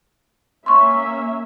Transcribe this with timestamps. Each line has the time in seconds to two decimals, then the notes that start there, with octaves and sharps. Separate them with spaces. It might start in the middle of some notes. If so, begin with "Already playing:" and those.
0.66 A#3 C#4 E5 C6 C#6